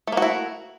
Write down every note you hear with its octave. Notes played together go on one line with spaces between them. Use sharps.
A3 A#3 E4 F#4